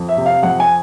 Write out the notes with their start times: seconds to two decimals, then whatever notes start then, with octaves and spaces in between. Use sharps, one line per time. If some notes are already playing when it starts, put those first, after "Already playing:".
Already playing: F2
0.09 E5
0.17 C3
0.26 F5
0.43 F2 F#5
0.60 G#5